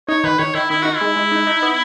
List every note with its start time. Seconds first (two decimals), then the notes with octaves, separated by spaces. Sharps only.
0.08 D#4 C#5
0.24 D#3 B4
0.39 D#3 C#5
0.55 D#3 E4
0.70 D#3 E4
0.82 D#4 F#4
0.95 E4
1.01 G#3
1.16 G#3
1.32 D#4
1.47 D#4
1.62 B3